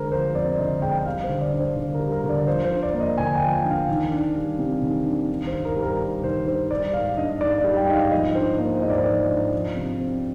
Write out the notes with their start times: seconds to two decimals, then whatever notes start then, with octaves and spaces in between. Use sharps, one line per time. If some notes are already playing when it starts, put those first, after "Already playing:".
Already playing: D3 G#3 A#4 C5
0.12 F3 C5
0.35 F2 D5
0.58 D3 D#5
0.82 G#3 G5
0.98 G5
1.06 G3 F5
1.24 C5
1.29 D3
1.41 D5
1.54 D4
1.59 C5
1.76 D3
1.94 A#4
2.00 G3
2.12 A#4
2.24 D3
2.29 D5
2.47 F3 C5
2.64 C5
2.70 D4
2.83 D5
2.94 A#3
3.00 D#5
3.18 D3 G#5
3.35 G5
3.41 F3
3.53 G5
3.65 D4
3.70 F5
3.88 D#3
4.12 D4
4.35 G3
4.59 C3
4.82 D#3
5.06 D4
5.29 D#3
5.47 C5
5.53 G2
5.65 A#4
5.77 G3
5.82 A#4
6.00 G2 A#4
6.24 D#3 C5
6.46 G2 C5
6.70 G3 D5
6.94 G#2 F5
7.17 D4 D#5
7.41 G#2 D5
7.58 D5
7.64 G3
7.77 G5
7.88 G#2 D#5
7.94 F5
8.11 F3 D#5
8.35 D4 C5
8.58 A#3 C5
8.82 G#2 D#5
8.90 D5
8.97 C5
9.04 F3 D5
9.30 D4
9.53 F3
9.76 C3
10.00 C4